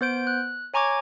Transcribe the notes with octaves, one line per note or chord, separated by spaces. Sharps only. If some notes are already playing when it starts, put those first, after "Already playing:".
B3 C5 G6 D7
F#6
C#5 G#5 A#5 C#6 D6 G#6